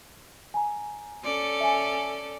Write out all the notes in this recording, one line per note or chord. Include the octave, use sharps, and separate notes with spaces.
G#5 A#5
C#4 A4 D5
E5 G#5